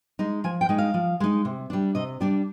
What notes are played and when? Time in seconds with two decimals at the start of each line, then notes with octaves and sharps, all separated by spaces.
0.19 G#3 D#4
0.44 F3 G#5
0.61 G5
0.69 G#3 D#4
0.78 F5
0.94 F3
1.20 G#3 D#4
1.45 C3
1.70 G3 D4
1.95 C3 D#5
2.21 G3 D4 D5